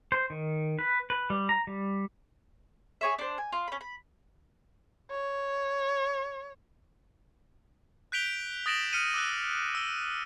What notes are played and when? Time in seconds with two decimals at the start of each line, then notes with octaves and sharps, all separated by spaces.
0.12 C5
0.30 D#3
0.79 B4
1.10 B4
1.30 G3
1.49 A#5
1.67 G3
3.01 G#4 C#5 E5
3.19 D4 C5
3.38 G#5
3.52 F4
3.68 C#4 B5
3.81 B5
5.11 C#5
8.12 F#6 G6 B6 D7 F7 G7
8.66 D#6 A6 A#6 D7 E7 F#7
8.93 F6 C#7 D#7
9.14 D6 E6 F#6
9.75 E6 G7